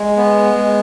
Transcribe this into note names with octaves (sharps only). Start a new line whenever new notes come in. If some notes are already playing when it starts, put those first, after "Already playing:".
Already playing: G#3
B3
G#3